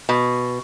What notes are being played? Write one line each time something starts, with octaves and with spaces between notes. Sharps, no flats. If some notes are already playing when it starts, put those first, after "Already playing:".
B2